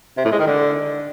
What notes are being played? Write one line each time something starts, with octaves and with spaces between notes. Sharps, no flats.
C3
A2
G#3
D#3
D3